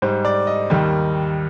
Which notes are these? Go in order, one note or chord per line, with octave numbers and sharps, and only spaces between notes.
G#2 G3 C5
D5
D#5
D#2 D#3 G3